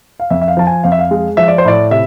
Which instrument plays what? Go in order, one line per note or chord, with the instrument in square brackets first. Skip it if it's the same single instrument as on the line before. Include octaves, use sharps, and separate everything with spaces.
[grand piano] F5
F2 E5
E5
F5
F3 A5
G#5
F2 F5
E5
F5
G#3
F3 E5
D5
C5
A2 D5
C3 E5